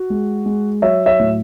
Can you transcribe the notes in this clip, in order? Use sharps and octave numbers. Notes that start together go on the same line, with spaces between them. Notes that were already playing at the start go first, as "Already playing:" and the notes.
Already playing: F#4
G#3
G#3
F#3 C#5 E5
C#5 E5
A2